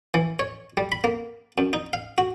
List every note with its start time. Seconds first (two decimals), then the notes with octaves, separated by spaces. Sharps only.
0.14 E3
0.39 C#5
0.77 G3
0.92 B5
1.04 A#3
1.58 F#2
1.73 D#4
1.93 F5
2.18 F#4